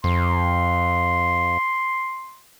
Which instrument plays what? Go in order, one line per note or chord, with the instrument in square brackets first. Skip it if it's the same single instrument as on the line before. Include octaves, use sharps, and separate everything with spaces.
[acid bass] F2 [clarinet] C6